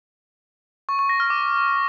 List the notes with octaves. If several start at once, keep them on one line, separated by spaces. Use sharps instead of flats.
C#6
C#6
A#6
F6
D6